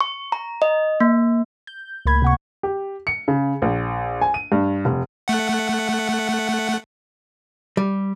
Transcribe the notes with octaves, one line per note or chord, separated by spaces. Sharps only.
C#6
A#5
D#5
A#3
G6
C#2 A2 A#3 B5 G#6
C3 F#5 C#6
G4
C#7
C#3
A#1
G#5
D#7
G2
F1
A3 F#5
G3